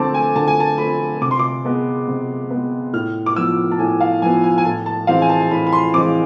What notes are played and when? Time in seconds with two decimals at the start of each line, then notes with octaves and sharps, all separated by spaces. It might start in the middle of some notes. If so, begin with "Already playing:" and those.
Already playing: D3 A3 C4 A5 D6
0.14 G#5
0.35 D3 A5
0.48 G#5
0.60 A5
0.78 A3 C4 B5
1.21 C3 D6
1.31 C6
1.39 D6
1.64 G#3 B3
2.08 C3
2.50 G#3 B3
2.93 A2 F6
3.26 D6
3.36 F3 B3 E6
3.71 A5
3.79 A2 G#5
4.01 F5
4.22 F3 B3 G#5
4.44 G#5
4.58 G#5
4.65 A2 A5
4.86 A5
5.07 E3 G#3 C4 F5
5.22 G#5
5.29 A5
5.41 A5
5.50 A2 B5
5.67 B5
5.73 C6
5.93 E3 G#3 C4 D6